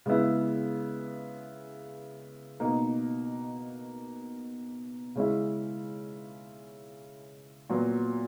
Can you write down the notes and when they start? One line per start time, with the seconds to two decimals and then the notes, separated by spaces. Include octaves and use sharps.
0.06 C#3 G#3 B3 E4
2.60 B2 A#3 D#4
5.15 C#3 G#3 C#4 E4
7.70 A#2 F#3 B3